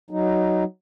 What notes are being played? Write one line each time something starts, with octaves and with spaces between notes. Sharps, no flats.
F#3 D#4